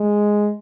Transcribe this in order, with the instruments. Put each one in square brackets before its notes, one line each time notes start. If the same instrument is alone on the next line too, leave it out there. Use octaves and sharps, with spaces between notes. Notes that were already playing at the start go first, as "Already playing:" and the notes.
Already playing: [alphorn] G#3